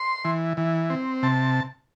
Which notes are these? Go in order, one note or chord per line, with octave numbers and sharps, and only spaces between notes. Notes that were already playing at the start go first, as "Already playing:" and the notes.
Already playing: C6
E3
E3
C4
C3 A5